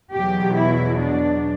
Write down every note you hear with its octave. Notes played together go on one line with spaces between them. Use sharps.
E2 B2 F#3 G4
E4
D4